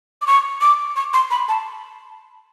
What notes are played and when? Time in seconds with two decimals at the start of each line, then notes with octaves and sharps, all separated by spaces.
0.22 D6
0.27 C#6
0.61 D6
0.96 C#6
1.14 C6
1.31 B5
1.49 A5